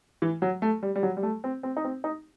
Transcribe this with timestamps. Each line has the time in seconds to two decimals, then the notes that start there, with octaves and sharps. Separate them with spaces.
0.22 E3
0.42 F#3
0.62 A3
0.83 G3
0.96 G3
1.03 F#3
1.17 G3
1.23 A3
1.44 C4
1.63 C4
1.77 D#4
1.84 C4
2.04 D#4